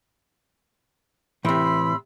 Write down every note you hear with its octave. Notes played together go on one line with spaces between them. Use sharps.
A2 C3 E3 B5 C6 E6